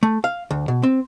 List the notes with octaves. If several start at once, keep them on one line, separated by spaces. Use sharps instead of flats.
A3
F5
D2
B2
C4